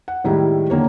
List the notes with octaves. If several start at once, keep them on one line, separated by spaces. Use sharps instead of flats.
F#5
A2 D#3 G3 G#3 E4
D3 D#3 A#3 C#5